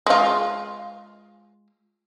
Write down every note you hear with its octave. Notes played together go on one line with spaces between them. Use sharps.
G#3 F4